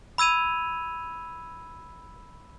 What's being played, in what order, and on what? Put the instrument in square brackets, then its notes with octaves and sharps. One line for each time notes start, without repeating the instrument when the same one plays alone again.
[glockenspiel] B5 E6 G#6 D#7 F7